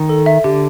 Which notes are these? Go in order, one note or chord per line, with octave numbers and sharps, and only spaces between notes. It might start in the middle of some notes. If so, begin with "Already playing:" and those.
Already playing: D#3
A4
E5
D3 G4